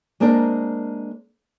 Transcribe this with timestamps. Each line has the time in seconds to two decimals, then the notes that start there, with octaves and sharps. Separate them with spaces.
0.20 G#3 A#3 C4 D4 A#4